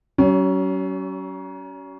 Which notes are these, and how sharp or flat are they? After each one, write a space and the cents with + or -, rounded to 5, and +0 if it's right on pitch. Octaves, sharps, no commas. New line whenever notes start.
F#3 +40 C#4 +15